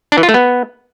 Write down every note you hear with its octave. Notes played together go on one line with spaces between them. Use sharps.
D4
E3
F4
A3
B3